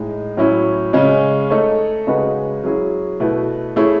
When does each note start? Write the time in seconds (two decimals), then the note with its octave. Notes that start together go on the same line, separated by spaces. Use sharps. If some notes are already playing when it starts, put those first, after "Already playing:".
Already playing: A2 G#3 D#4
0.37 A2 F#3 C#4 E4
0.93 C#3 G#3 C#4
1.50 A3 D#4 A4 C#5
2.07 C#3 G#3 D#4 F#4 B4
2.64 F#3 C#4 E4 G#4
3.20 B2 A3 E4 B4
3.76 A3 E4 G#4 C#5